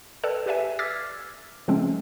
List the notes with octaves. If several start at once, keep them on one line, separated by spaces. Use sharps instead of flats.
A4 B4 D5 G5 A5
G4 B4 D5 E5 G#5
D6 E6 F6 G#6 A6 B6
C#3 F3 G#3 A3 C4 C#4